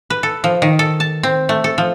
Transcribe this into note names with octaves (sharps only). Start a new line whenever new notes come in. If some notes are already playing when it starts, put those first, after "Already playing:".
B4
A4
F3
D#3
A4
A5
C4
A3
A4
F3